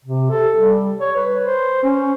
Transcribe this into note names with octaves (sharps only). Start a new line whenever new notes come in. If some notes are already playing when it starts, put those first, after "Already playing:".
C3
A4
G3
C#5
B4
C5
C#4